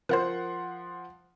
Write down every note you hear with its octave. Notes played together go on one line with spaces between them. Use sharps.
F3 A#4 C5 F#5 C6